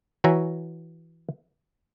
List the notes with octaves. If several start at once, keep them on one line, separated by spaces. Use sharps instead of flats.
E3 F#4 C#5 E5 G#5 A#5